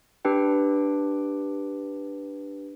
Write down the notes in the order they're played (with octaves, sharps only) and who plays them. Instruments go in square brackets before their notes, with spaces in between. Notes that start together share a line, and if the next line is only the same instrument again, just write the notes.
[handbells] D4 G4 B4 G5